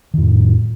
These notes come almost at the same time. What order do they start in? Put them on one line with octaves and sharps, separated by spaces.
D#3 F2 A2